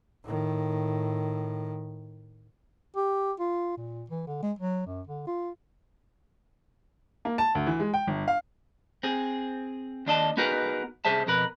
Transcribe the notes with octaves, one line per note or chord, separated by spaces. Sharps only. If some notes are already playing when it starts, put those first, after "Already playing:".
A2 D#3
G4
F4
A#2
E3
D3
G#3
F#3
F#2
D3
F4
A#3
A5
D2
E3
G#3
G5
G1
F5
C4 G#4
D#2 D4 D#5 A5
B3 D#4 F#4 G#4 A#4 B4
C2 G#4 C5 E5 A5
F2 B2 A#4 B4